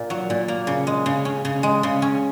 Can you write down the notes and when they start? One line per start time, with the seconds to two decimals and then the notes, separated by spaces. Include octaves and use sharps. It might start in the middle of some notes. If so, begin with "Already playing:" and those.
Already playing: A#2 A#3
0.10 F#3
0.30 A#2
0.48 A#3
0.67 C#3
0.87 G#3
1.06 C#3
1.25 C#4
1.45 C#3
1.63 G#3
1.83 C#3
2.02 C#4